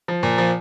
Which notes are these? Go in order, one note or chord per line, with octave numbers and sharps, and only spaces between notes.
F3
A#2
F3